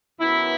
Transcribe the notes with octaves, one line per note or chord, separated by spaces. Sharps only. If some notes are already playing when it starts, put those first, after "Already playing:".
F#2 E3 B3 E4